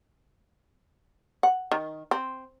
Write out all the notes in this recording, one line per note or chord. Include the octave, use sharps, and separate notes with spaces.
F#5
D#3
C4